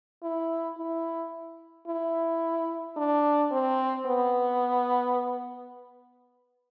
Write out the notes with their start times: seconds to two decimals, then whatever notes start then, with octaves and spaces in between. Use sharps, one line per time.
0.23 E4
0.78 E4
1.88 E4
2.97 D4
3.52 C4
4.06 B3